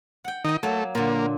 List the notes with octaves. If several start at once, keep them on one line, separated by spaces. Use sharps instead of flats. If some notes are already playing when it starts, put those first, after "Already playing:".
F#5 G5
D#3 D#4 D#5 G5
F#3 A3 A#3
A#2 D3 A#3